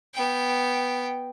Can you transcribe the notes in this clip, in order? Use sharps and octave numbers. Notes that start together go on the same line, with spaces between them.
B3 G5